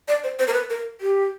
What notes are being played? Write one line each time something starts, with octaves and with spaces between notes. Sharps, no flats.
D5
C5
C5
A#4
B4
A#4
G4